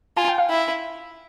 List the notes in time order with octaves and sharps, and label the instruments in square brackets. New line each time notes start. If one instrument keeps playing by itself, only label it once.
[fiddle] F4 [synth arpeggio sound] G#5
[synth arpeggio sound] G5
F5
[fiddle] E4